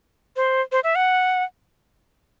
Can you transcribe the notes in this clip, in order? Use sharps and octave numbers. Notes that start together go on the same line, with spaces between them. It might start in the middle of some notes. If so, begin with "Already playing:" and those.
C5
C5
E5
F#5